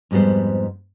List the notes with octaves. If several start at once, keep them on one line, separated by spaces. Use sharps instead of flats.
F2 G#2 G3 B3 C5